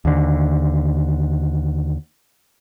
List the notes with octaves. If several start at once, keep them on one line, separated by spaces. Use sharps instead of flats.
D#2 D3